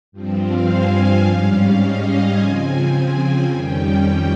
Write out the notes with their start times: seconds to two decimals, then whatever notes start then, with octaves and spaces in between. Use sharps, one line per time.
0.12 G2 F3 C4
0.41 F5
0.68 G#5
1.25 G#2 G3 C#4 F5
1.81 D#5
2.10 G#5
2.38 C#3 F3 C4
3.50 F2 D#3 G3 C#4 G5